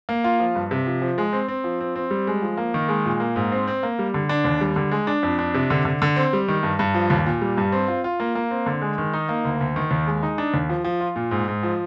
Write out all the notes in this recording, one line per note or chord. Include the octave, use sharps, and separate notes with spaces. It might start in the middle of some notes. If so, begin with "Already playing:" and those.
A#3
F4
F3
G2
C3
F3
F3
G#3
C4
C4
F3
C4
C4
G3
G#3
F3
A#3
D#3
G#3
A#2
A#3
G#2
C4
C4
A#3
G3
D3
D4
D#2
G3
D3
G#3
D4
F2
D4
C3
D3
D3
D3
C4
G3
D#3
G2
G2
F3
D#2
A#2
G3
G2
C4
F4
F4
A#3
A#3
C4
D3
G#3
D#3
D#4
A#3
D2
D2
D#3
D#2
G#3
D#4
D4
D#2
F3
F3
F4
A#2
G#2
G#2
F3